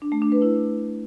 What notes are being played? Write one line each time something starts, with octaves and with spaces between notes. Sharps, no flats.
D4
A3
D4
B4
E4